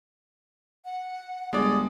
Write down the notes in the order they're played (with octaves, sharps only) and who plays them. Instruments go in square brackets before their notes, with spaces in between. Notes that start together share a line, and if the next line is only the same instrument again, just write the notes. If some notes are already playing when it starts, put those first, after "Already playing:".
[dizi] F#5
[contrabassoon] G1 [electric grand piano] G#3 D5 [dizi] D#6